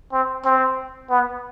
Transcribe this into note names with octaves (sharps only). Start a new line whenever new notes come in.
C4
C4
B3